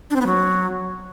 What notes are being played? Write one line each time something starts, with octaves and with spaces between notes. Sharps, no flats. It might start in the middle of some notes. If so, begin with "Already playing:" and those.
D4
C4
B3
F#3